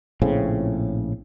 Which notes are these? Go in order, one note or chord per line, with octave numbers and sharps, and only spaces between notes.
A#1 A2 C#3 C4